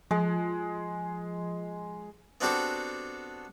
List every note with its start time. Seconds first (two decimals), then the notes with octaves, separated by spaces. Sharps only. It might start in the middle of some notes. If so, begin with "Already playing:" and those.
0.11 F3 G#3
2.41 B3 C4 D4 F#4 G4 A4